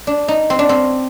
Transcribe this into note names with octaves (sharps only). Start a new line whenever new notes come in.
D4
D#4
C4
D4
C4